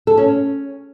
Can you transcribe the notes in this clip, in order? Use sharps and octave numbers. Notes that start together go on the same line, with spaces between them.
A4
C#4
C#4